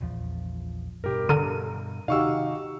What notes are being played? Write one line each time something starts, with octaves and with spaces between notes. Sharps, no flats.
A#1 E2 F3
G2 B2 G4 A#4
D3 A4 A#4 D#7
C3 D#3 D#4 F#4 G4 F5 C#6 E6